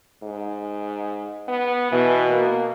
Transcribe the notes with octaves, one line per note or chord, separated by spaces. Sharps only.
G#2
B3
B2 E3
A#3